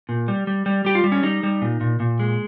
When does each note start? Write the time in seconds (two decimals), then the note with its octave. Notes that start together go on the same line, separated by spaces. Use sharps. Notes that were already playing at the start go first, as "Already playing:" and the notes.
0.09 A#2
0.28 G3
0.47 G3
0.66 G3
0.85 G3 G4
0.95 F4
1.04 G3
1.12 C#4
1.23 G3 D#4
1.43 G3
1.62 A#2
1.81 A#2
2.00 A#2
2.20 G#3